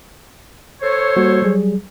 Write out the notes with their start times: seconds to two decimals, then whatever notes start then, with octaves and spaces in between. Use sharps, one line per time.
0.81 A4 C5 C#5
1.16 G3 A#3 F#4
1.42 F#3 G3 G#4